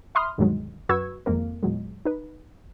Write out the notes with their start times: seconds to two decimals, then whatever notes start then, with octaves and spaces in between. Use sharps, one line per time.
0.15 E5 B5 C6 D#6 F6
0.38 D2 G2 B2 D#3 F#3 G#3
0.89 F#2 F#4 B4 C#6 E6 G#6
1.26 G#1 F2 G#3 A#3 A#4
1.63 E2 A#2 F#3 G#3
2.05 D#4 B4